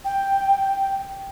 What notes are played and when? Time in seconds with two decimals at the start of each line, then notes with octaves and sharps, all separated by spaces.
0.05 G5